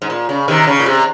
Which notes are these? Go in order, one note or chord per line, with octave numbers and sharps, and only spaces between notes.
G#2
A#2
C#3
C3 D#3
C#3
A#2
C3